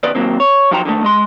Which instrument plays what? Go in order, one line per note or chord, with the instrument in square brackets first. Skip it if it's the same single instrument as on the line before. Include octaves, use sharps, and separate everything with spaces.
[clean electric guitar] B2 D#3 B4 D5 D#5
D#3 F#3 A#3 C4
C#5
F3 F#3 D#4 C5 G5 A#5
D3 D#3 F3 A3
G#3 D#5 C6